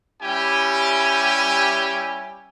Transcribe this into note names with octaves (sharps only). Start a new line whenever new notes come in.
G3 C#4 E4 G4 G#5